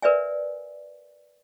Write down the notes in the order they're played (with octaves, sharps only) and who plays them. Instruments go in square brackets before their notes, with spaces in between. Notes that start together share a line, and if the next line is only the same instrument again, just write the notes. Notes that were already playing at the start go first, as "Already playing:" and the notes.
[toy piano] A#4 B4 D5 E5 G#5